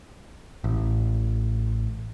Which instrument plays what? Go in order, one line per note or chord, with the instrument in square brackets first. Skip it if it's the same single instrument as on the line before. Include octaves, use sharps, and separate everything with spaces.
[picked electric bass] A1